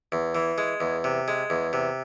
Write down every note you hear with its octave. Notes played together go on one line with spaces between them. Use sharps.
E2
E3
G#3
E2
C3
G#3
E2
C3